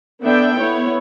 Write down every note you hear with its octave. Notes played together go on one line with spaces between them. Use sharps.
D3 B3 D4 A4 E5 G5
B3 E4 C#5